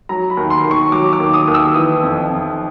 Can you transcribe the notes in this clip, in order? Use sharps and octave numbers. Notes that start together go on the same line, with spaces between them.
F#3 A#5
B5
D#2
C6
D#2
C#6
F#3 D6
D6
D#2
D#6
D#2
E6
E3 D#6
F2
F2